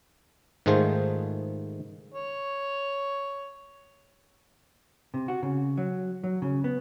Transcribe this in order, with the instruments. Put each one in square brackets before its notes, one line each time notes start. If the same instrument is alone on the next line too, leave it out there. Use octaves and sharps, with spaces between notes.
[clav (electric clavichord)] G#2 D#3 A3 F4 G#4 C5
[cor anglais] C#5
[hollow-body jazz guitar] C3
F#4
C#3
F#3
F#3
C#3
B3